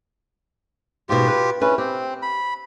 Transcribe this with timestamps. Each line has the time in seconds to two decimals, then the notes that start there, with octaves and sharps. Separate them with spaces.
1.09 G#2 B2 F4 G4
1.27 B4
1.61 C#4 D4 E4 B4
1.78 C4 G4
2.22 B5